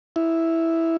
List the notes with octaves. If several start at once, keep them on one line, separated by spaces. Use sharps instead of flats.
E4